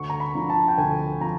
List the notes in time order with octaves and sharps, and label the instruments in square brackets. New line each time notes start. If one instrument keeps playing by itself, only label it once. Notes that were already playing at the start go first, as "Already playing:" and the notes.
Already playing: [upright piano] D2 C#6
A#5
B5
D3 F3
A5
G5
D2 G#5
F3 A#5